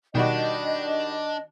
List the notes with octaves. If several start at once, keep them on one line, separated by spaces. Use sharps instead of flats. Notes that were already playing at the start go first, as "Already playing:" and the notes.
B2 D#3 G3 D4 F#4 D#5